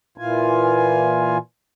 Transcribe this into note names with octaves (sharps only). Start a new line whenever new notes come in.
A#2 E3 F4 G#5